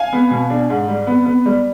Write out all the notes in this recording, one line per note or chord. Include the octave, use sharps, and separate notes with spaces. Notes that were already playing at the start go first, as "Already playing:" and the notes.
Already playing: F5 G#5
B3
B2
D4
G#2
G3
B3
B3
G3